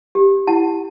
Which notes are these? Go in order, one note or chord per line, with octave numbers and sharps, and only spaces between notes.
G4
E4 F#5 A5